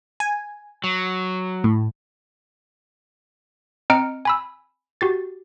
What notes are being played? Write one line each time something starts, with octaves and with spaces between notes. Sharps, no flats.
G#5
F#3
A2
C4 D#5 A#5 F6 C#7 D7
G#5 B5 E6
F#4 G4 A6